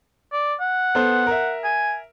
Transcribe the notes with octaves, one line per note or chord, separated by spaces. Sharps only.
D5
F#5
B3 A4 C5
A#4 E5
G#5